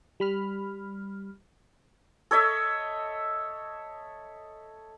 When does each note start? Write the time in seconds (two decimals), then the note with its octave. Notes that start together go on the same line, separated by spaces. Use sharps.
0.20 G3 B5 F6
2.31 A4 C#5 D#5 E5